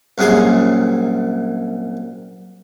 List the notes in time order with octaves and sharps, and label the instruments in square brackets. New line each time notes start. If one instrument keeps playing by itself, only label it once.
[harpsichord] C2 F#2 A#2 G#4 G#5 C6